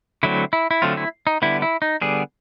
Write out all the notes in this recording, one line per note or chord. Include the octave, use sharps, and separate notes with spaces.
D3 F#3 A3 C4 E4
E4
E4
D3 F#3 A3 C4 F4
E4
D#4
D3 G3 B3 E4
E4
D#4
D3 G3 B3 G#4